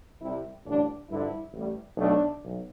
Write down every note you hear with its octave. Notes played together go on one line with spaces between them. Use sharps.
C2 C3 G3 E4
A1 G2 D3 D4
G2 D3 F3 E4
A1 A2 G3
B1 B2 A3 D4
B1